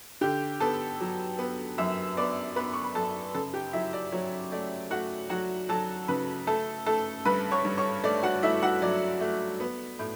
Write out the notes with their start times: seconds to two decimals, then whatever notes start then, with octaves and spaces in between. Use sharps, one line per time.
0.21 D3 G4 G5
0.60 B3 A4 A5
1.00 F#3
1.39 B3
1.78 F#2 E5 E6
2.17 B3 D5 D6
2.56 B3 B4 B5
2.74 C#6
2.84 B5
2.95 F#2 A4 A5
3.34 C#3 A4 A5
3.54 G4 G5
3.73 F#3 E4 E5
3.93 D5
4.12 F#3 C#5
4.52 A3 D5
4.91 A3 F#4 F#5
5.29 F#3 F#4 F#5
5.69 F#3 A4 A5
6.08 C#3 B4 B5
6.47 A3 A4 A5
6.86 A3 A4 A5
7.25 G2 B4 B5
7.52 C#5 C#6
7.65 G2
7.78 C#5 C#6
8.03 A3 D5
8.23 F#4 F#5
8.43 A3 E4 E5
8.63 F#4 F#5
8.82 F#3 D5
9.21 A3
9.60 B3
9.99 A2